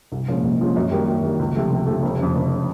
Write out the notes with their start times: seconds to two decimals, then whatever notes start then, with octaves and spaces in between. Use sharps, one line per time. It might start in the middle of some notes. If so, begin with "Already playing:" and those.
0.12 C2
0.28 A#2 F3 G#3 C#4
0.43 C2
0.60 A#2 F3 G#3 C#4
0.76 F#2
0.91 D#3 G3 A#3
1.08 F#2
1.23 D#3 G3 A#3
1.39 C#2
1.56 C3 F3 A3
1.71 C#2
1.87 C3 F3 A3
2.03 F1
2.19 F2 C#3
2.35 F1
2.54 C#3